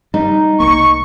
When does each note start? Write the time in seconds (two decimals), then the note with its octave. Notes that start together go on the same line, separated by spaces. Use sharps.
0.14 G3 D#4
0.60 C2 A#3 C#6